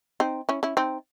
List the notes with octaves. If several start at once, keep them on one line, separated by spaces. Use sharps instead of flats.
C4 D#4
C#4 E4
C#4 E4
C4 D#4